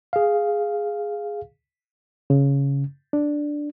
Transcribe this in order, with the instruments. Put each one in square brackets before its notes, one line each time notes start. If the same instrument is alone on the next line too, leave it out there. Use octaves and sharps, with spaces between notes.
[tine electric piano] G#4 F5
[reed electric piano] C#3
D4